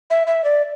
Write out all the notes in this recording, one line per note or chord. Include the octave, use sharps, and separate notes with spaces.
E5
E5
D5